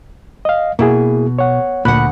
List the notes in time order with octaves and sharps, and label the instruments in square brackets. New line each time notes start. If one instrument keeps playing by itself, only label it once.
[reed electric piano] D#5 F5
[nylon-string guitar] B2 [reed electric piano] A#3 E4 G#4
[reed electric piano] C#5 F#5
[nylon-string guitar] D2 F#5 [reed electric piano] A#2 B5 F#6